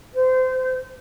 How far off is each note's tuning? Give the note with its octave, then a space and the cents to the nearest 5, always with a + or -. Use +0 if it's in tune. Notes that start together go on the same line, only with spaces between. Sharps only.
C5 -25